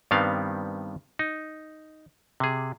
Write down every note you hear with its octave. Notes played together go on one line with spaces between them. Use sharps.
G2 D#3 G3 B3 C4 F5
D#4
C3 G#4